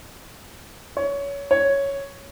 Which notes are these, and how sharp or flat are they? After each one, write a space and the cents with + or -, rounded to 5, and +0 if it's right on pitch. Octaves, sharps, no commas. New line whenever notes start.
C#5 +20
C#5 +0